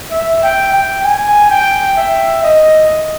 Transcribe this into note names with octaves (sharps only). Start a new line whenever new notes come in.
E5
G5
G5
G#5
G5
E5
D#5